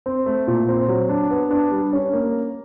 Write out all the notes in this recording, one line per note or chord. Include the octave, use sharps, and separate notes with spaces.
C4
A3
A#2
C4
F#3
D4
B3
D4
G3
C#4
A#3